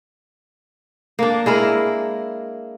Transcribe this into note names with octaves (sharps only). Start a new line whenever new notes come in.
A#3 D4
G#3 E4 A#4